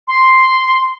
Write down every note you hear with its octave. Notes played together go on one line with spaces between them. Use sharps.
C6